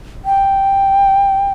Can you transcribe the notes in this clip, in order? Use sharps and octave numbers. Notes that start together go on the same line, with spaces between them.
G5